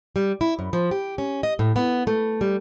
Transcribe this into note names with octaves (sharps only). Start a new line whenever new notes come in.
G3
E4
F#2
F3
G4
C#4
D#5
A2
B3
A3
G3